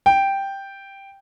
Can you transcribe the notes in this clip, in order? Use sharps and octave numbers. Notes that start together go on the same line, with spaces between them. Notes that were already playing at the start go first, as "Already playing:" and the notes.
G5